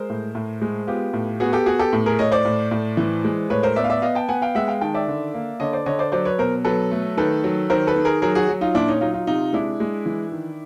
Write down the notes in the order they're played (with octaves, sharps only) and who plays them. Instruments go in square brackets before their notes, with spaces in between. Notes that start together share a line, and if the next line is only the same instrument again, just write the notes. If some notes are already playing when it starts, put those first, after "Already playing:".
Already playing: [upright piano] G#3 A#4 C5
A2
A2
G#3
B3 F4 G4
A2
B3 F#4 G#4
G4 A4
B3 F#4 G#4
G4 A4
A2
G#4 A#4
A2 C#5 D#5
C5 D5
A2
A2
E3
G#3
A2 B4 C#5
A#4 C5
B3 D5 E5
F5
D5 E5
B3 D#5 F5
G5 A5
B3 F#5 G#5
F5 G5
G#3 E5 F#5
F5 G5
D#3 G5 A5
D5 E5
D3
A#3
D3 C#5 D#5
C5 D5
D3 C#5 D#5
C5 D5
F#3 C5 D5
B4 C#5
B2 A#4 C5
F#3 A4 B4
A3
D#3 A4 B4
F#3
D#3 A#4 C5
A4 B4
D#3
G#4 A#4
F#3 G#4 A#4
F#4 G#4
F#3
D#4 F4
A#2 D4 E4
C#4 D#4
F#3 D#4 F4
D#4 F4
C3 D#4 F4
G#3 D4 E4
G#3
E3
D#3